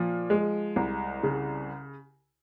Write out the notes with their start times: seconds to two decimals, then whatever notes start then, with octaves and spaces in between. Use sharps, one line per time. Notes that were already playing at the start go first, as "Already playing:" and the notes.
Already playing: A#2 F3
0.30 G#3
0.76 C2
1.23 C#3